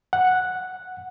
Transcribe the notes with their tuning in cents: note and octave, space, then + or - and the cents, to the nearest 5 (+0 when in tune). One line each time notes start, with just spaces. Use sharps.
F#5 -5